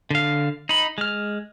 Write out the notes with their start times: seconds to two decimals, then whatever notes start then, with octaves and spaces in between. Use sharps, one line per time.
0.11 D3 F5
0.69 D#4 B5
0.98 G#3 F6